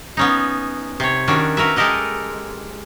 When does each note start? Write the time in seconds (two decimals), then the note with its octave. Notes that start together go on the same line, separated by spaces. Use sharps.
0.17 B3 C#4 D#4
1.00 C3 C#5
1.28 D#3 C#4 D4 F#4
1.57 F#4 A#4 B4 E5
1.76 G#3 G4 A4 A#4 D#5 F#5